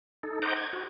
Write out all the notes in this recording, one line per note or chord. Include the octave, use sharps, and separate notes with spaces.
D#4 A4
C5 D#5 F#5 A#5 D6 G6
G#6
F#4